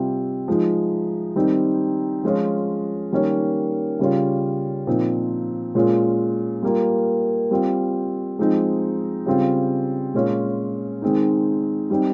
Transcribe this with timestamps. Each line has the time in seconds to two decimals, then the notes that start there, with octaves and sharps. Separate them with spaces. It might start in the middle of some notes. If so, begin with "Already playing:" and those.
Already playing: C3 G3 C4 F4
0.48 F3 G#3 D#4
1.36 D#3 G3 C4 D#4
2.23 F3 G#3 C#4 F4
3.12 D#3 G3 A#3 C#4
3.99 C#3 G3 C#4 F4
4.87 A#2 F3 C4 D#4
5.75 A#2 G#3 C#4 F4
6.63 G3 A#3 F4
7.51 G3 C4 F4
8.39 F3 G#3 C4 D#4
9.26 C#3 G3 C4 F4
10.14 A#2 G#3 C#4 F4
11.02 D#3 G#3 C4 D#4
11.90 G3 C4 D#4